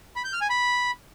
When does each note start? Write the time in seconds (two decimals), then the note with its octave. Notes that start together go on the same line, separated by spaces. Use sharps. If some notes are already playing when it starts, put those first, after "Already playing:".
0.16 B5
0.24 G6
0.33 F6
0.41 G#5
0.50 B5